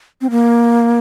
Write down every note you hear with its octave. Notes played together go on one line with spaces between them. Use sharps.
C4
A#3